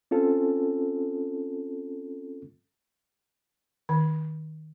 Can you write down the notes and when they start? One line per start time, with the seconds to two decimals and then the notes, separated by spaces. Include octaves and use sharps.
0.11 C4 C#4 F4 A4
3.89 D#3